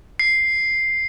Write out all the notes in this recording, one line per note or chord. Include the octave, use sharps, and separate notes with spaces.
C7